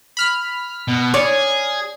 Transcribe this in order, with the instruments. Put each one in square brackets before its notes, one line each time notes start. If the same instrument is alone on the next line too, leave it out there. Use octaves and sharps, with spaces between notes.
[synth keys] B5 F6 B6
[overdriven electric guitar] B2
[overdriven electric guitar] G#4 [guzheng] C#5 D5